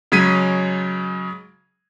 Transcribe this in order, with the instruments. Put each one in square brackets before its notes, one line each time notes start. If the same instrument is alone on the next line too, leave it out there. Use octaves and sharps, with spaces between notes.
[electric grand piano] C#3 F#3 G#3 G#6 B6 D#7